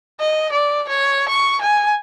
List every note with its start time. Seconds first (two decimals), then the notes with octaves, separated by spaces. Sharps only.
0.20 D#5
0.52 D5
0.89 C#5
1.29 C#6
1.61 G#5